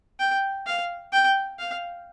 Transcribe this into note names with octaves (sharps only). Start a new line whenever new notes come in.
G5
F5
G5
F5